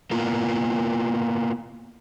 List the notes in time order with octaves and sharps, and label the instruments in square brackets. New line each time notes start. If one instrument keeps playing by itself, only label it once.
[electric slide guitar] A#3 B3 E4 F4 A#4